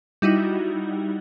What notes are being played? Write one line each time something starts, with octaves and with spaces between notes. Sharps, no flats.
G3 D#4 E4 F#4